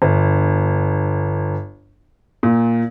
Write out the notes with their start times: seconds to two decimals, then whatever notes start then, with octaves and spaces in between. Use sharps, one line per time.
0.02 G1
2.43 A#2